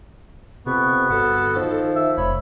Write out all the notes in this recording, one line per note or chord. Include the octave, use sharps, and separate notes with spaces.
F2 C3 B3 C#6
G1 F#4 A4
D#3 F3
E5
F1 C#5 B5